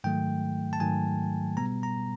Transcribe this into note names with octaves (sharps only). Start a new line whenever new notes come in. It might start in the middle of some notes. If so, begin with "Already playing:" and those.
G#2 D#3 F#3 A3 G5
A5
G#2 D#3 F#3 A3 G#5
B2 G3 B3 A#5
A#5